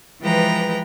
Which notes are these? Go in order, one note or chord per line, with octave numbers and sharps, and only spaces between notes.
E3 F3 G#3 B4 G5 A#5